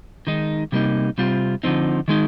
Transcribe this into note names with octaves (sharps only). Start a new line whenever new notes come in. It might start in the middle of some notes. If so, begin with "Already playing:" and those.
D#3 G#3 D#4
C3 G3 A#3 D#4
C3 G3 C4 F4
D3 F3 C4 D#4
D#3 G#3 D#4